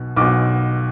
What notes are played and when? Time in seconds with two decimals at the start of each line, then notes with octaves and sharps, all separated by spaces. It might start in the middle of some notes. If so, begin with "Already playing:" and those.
Already playing: B1 B2
0.17 B1 B2 D6